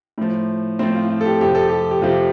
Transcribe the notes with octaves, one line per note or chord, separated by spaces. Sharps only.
A2 F3
A2 F3 C4
F4
F4
A4
G4
F2 C3 F3 G4
A4
G4
G4
F2 C3 F3 F4